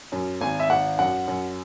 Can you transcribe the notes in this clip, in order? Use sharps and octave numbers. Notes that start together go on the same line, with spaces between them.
F#2
G#1 G#5
E5
G#1 F#5
F#2 F#5
F#2